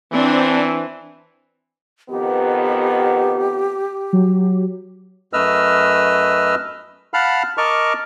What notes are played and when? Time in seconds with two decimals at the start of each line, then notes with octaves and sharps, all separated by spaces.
0.12 E3 C4 D4
2.10 F2 D#3 B3 G4
4.13 F#3
5.33 F#2 A3 B4 D#5 E6 F6
7.14 F5 F#5 A5 B5 F6
7.58 A#4 D#5 A5 C#6 D6 F6